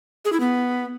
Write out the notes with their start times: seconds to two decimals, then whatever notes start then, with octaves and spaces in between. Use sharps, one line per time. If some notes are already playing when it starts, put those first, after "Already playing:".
0.25 G#4
0.33 E4
0.40 B3